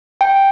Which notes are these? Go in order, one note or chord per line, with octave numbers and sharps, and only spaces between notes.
G5